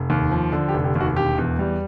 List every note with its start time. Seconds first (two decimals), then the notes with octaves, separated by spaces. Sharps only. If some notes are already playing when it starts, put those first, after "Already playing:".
Already playing: F1
0.10 D#2
0.31 F3
0.52 D3
0.68 G4
0.74 F1
0.84 G4
0.95 D#2 F#4
1.16 E1 G4
1.38 E2
1.59 G3